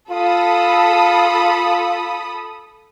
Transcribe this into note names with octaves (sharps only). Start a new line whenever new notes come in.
F4 A4 B5 D#6